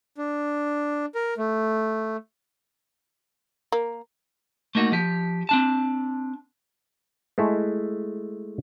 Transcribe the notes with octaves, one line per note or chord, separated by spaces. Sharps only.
D4
A#4
A3
A#3
A3 A#3 D#4 F#4
F3 G4
C4 D4 A5
G#3 A3 E4